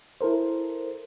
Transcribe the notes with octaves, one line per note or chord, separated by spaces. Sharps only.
E4 A4 A#4 C5